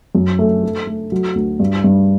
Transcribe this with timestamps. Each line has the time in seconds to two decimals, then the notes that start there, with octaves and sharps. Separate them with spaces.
0.15 F#2
0.39 A3
0.63 A4
0.87 A3
1.12 F#3
1.35 D2
1.60 G2
1.84 G2